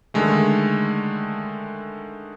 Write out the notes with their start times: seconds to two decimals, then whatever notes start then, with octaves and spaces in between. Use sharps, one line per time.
0.14 D3 D#3 G#3 A3